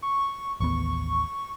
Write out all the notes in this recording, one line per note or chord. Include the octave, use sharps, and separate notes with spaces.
C#6
A1 D#2 B3 C#6